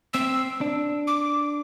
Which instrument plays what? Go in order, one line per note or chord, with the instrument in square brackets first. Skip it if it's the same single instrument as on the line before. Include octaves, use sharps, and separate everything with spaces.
[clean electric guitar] C4 [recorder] E6
[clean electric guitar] D4
[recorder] D6